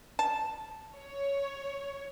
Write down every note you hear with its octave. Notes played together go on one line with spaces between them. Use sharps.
A5
C#5